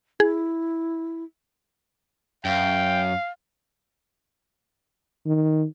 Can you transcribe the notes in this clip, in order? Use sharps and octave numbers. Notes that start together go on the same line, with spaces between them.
E4 G#4
F#2 F5 G5
D#3